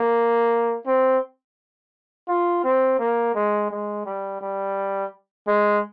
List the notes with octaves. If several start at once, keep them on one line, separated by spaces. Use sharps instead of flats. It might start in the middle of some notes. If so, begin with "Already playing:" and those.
Already playing: A#3
C4
F4
C4
A#3
G#3
G#3
G3
G3
G#3